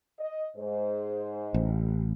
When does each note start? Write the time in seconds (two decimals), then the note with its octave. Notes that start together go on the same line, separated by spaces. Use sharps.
0.19 D#5
0.57 G#2 G#3 C5
1.54 A1